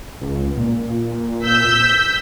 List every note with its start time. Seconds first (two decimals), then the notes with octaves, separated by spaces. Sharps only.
0.22 C#2
0.58 A#2
1.44 E6 G6 B6